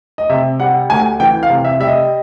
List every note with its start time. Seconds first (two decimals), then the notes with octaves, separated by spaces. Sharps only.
0.18 D#5
0.29 C3 E5
0.60 G3 F#5
0.90 D2 G#5
1.20 E3 G5
1.43 F5
1.50 C3
1.65 E5
1.80 G3 E5
1.88 D#5